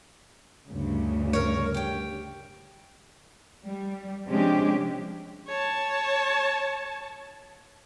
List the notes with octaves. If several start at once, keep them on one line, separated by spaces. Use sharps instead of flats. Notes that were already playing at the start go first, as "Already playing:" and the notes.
D2 G2 C#3
A#4 C#5
G4 G5
G3
C3 F3 G#3 C#4 D4 G4
C#5 A5